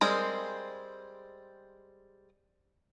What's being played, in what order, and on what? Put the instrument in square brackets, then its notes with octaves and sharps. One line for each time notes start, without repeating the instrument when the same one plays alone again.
[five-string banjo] G3 G#3 C4 G#4 A#4